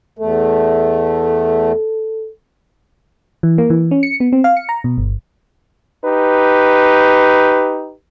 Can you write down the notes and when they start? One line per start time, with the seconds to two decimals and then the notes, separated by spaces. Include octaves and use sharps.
0.19 E2 A3 A4
3.43 E3
3.58 A#3
3.70 E3
3.91 C#4
4.03 C#7
4.20 B3
4.32 C4
4.44 F5
4.57 C#7
4.69 A#5
4.84 B2
4.98 G1
6.05 D#4 G4 B4